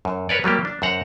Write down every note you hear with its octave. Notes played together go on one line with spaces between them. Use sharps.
F#2
A#4 B4 C#5 D5
F#3 G3 A#3 G4
D4
F#2 C5 F#5 A#5